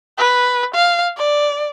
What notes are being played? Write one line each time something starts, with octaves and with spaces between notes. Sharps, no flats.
B4
F5
D5